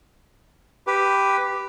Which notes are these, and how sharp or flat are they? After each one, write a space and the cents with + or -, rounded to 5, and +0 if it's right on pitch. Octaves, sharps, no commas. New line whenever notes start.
G4 +0 B4 +5